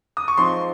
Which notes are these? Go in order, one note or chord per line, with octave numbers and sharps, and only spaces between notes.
D#6
C#6
G#2 F3 C4 D#4 C6